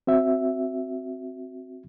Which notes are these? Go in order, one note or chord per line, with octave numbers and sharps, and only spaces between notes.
C4 F#4 E5